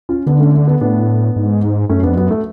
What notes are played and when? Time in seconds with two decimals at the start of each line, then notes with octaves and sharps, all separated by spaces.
0.09 C#4 F4
0.26 D3 B3 D4
0.40 A3 C#4
0.54 A3
0.67 B3
0.81 A2 B3 D4
1.36 G#2
1.90 F#2 A3 C#4
2.03 F2 B3 D4
2.17 F#2 B3
2.31 A3